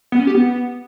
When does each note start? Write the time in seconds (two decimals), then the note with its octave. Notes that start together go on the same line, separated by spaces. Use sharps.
0.12 B3
0.20 C#4
0.27 G4
0.35 B3